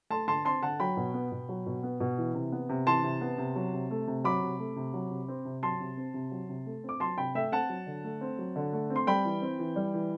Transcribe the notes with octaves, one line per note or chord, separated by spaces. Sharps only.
A3 A5 C6
D3 A5 C6
C4 A5 C6
D3 F#5 A5
F#3 G5 B5
B2
B3
B2
F#3
B2
B3
B2
E3
C3
B3
C3
E3 A5 C6
C3
B3
C3
F#3
C3
A3
C3
F#3 B5 D6
C3
A3
C3
F#3
C3
C4
C3
F#3 A5 C6
C3
C4
C3
F#3
C3
A3
C4 D6
F#3 A5 C6
C3 G5 B5
A3 E5 G5
C4 F#5 A5
F#3
D3
A3
C4
F#3
D3
A3
C4
C6
G3 G5 B5
E3
C4
E3
G3
E3